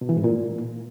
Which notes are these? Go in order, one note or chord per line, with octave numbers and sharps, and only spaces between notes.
B2
E3
G#2
A#2